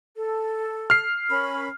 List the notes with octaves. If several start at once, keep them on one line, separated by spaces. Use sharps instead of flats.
A4
F6 C7
C#4 A#4 B5